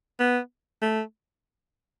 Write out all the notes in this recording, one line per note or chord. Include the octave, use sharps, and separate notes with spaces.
B3
A3